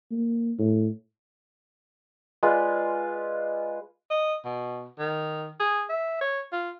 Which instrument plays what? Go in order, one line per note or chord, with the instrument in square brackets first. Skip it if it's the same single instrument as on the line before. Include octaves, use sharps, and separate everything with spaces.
[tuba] A#3
A2
[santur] G#3 F4 B4 D5
[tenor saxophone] D#5
B2
D#3
G#4
E5
C#5
F4